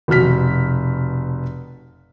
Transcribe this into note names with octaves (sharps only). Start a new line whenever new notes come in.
F1 B2 F#4 F6 B6